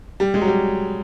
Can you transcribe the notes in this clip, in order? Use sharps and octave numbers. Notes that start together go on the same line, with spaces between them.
G3
G#3
F#3
G3